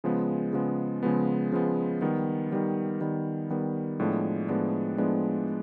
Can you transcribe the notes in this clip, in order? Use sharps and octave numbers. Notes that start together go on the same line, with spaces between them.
C#3 F3 G#3 B3
C#3 F3 G#3 B3
C#3 F3 G#3 B3
C#3 F3 G#3 B3
D#3 G3 B3
D#3 G3 B3
D#3 G3 B3
D#3 G3 B3
A2 F3 G#3 B3 D4
A2 F3 G#3 B3 D4
A2 F3 G#3 B3 D4